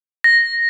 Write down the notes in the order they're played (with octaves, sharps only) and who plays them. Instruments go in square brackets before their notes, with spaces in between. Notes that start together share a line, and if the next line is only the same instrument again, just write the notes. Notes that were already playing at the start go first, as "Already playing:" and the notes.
[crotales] A#6